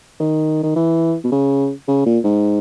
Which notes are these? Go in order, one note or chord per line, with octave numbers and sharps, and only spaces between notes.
D#3
D#3
E3
B2
C#3
C#3
A#2
G#2